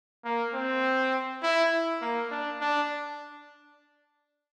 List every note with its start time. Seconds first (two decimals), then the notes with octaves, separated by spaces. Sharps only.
0.25 A#3
0.54 C4
1.43 E4
2.02 A#3
2.31 D4
2.61 D4